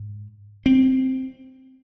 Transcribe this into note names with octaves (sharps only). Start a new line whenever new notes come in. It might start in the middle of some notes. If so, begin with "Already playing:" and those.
Already playing: G#2
C4